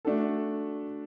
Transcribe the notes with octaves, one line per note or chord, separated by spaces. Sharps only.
A3 D4 F#4 A4